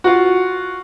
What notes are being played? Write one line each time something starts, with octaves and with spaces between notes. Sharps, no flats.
F4 F#4